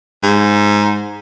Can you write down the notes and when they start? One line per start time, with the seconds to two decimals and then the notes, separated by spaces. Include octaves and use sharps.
0.23 G#2